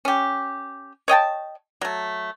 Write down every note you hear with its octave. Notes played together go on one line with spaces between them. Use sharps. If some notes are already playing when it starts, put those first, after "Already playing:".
C#4 G4
C#5 D#5 G5 A5
F#3 A3